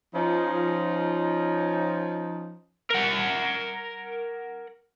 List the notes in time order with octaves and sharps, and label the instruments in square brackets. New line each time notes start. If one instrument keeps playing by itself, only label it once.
[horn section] F3 C#4 D#4
[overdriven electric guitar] A#4 F#5